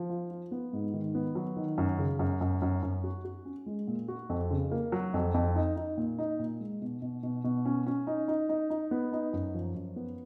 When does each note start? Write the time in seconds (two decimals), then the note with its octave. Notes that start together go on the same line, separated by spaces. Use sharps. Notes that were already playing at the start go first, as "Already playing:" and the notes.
Already playing: F3
0.10 F4
0.31 F4
0.51 B3
0.73 G#2
0.94 D#3
1.15 B3
1.35 F#3
1.56 D#3
1.78 F#2
1.99 C#3
2.19 F#2
2.41 F#2
2.62 F#2
2.83 F#2
3.04 F#4
3.25 F#4
3.45 C#4
3.66 G#3
3.88 A#2
4.08 F#4
4.29 F2
4.51 C#3
4.72 A#3
4.92 F#3
5.14 F2
5.34 F2
5.56 D#4
5.77 D#4
5.98 A#2
6.19 D#4
6.39 A#2
6.61 G#3
6.82 B2
7.02 B2
7.23 B2
7.44 B2
7.65 C#4
7.87 C#4
8.07 D#4
8.28 D#4
8.49 D#4
8.70 D#4
8.91 B3
9.13 D#4
9.33 F#2
9.54 F3
9.75 F#2
9.96 B3